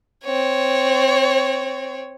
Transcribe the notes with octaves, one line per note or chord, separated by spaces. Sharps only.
C4 C#5